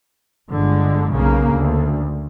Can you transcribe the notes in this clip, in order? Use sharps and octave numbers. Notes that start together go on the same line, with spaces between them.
G1 D3 G#3
B1 C#3 A#3
D2